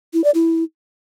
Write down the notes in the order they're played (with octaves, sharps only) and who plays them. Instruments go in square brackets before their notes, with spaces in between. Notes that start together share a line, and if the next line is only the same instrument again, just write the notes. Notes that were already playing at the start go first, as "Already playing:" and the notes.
[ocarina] E4
D5
E4